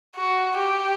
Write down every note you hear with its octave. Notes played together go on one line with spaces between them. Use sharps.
F#4
G4